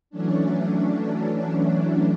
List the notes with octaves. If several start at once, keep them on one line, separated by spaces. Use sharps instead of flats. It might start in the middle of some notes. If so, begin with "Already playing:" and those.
E3 F#3 A3 C#4 D4